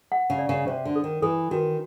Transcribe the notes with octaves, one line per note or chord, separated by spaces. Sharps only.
F#5
C#3
D5
C#3
C3 C5
D3
A4
D#3
E3 A4
D#3 F#4